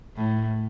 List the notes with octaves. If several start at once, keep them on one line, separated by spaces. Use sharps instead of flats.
A2